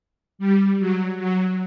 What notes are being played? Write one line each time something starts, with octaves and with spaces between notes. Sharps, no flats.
G3
F#3
F#3